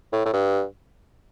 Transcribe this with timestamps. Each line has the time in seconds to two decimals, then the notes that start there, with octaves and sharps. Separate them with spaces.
0.13 A2
0.26 A2
0.33 G2